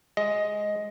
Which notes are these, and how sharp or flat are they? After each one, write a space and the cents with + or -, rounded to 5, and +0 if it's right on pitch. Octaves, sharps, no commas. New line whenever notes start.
G#3 +0 D#5 +10